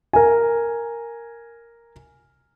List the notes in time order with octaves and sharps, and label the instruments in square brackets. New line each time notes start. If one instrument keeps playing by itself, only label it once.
[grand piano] A#4 G#5